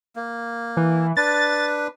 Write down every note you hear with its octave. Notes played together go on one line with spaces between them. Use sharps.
A#3
E3
D4 B4 A6